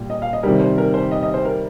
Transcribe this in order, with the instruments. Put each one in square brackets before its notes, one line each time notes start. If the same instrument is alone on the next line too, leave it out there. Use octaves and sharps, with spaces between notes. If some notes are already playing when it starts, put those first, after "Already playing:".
Already playing: [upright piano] A#2 G3
[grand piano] D#5
F5
D#5
[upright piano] C3 D#3 G3 [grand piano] A#4
[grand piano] C5
A#4
C5
D#5
D#5
C5
A#4